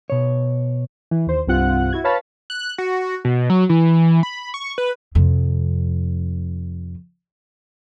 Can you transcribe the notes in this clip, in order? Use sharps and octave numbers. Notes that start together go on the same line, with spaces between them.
B2 C#5
E3
D#2 C5
C2 G2 C4 F4 F#5 F#6
E4 F#4 G#6
B4 C#5 F5 A5 B5
F#6
F#4
B2
F#3
E3
B5
C#6
B4
F2 C3